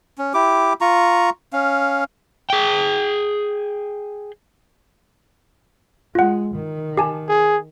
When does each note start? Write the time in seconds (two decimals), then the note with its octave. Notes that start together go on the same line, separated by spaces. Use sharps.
0.18 C#4
0.34 E4 G4 D6
0.81 F4 A#5 C#6
1.53 C#4 F5
2.50 G#4 G5
6.15 G#3 F4 F#5
6.56 D#3
6.97 G4 G#5 A5
7.28 G#4